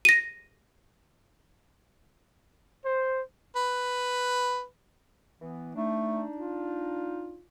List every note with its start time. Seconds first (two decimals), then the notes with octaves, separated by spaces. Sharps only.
0.05 A#6 D#7
2.84 C5
3.56 B4
5.42 E3 B3
5.75 A3 D4 D#4
6.37 F4